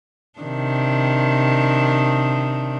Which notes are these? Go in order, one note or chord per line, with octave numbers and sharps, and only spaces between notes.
C3 D#3 D4